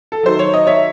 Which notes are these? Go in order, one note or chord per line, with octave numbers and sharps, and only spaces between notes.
A4
D#3 F#3 C5
C#5
D#5
C#5 E5